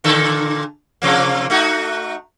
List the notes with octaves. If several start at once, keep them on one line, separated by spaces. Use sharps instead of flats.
A#2 D3 A4
C3 F3 A#3
A3 D#4 F#4